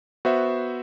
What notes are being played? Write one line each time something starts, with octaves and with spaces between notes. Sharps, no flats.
B3 F#4 C5 E5